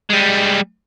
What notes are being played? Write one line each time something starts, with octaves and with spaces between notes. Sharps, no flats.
G3 G#3